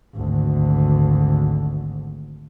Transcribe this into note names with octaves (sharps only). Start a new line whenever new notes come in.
G#1 D2